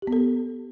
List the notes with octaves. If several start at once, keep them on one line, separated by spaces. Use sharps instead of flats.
G4
B3
A4